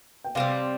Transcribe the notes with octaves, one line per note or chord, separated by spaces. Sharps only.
G5
C3 G3 C4 F5